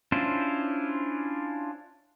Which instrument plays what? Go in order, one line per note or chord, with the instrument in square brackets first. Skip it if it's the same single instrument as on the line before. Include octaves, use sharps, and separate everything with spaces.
[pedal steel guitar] C#4 D4 E4 F4 C5